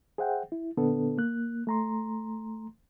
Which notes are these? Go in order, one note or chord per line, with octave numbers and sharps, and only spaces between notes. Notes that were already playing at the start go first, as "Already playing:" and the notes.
G#4 C5 E5 F#5 G5
E4
A#2 D3 B3 D4 A4
A#3 F#6
A3 A#5 C6